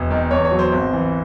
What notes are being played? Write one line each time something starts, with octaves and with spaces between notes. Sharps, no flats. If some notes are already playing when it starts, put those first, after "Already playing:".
Already playing: E1
D#3
E2 C#5
C#5
F#3
C5
G#1
E3